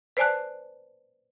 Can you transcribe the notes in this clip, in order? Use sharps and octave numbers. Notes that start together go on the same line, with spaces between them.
B4 C5 D5 G#5 A5 F#6